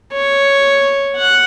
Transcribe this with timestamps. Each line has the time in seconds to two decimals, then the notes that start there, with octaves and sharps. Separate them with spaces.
0.13 C#5
1.16 F#5